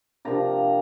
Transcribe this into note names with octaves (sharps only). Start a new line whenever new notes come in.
C3 F3 A#3 D4 A#5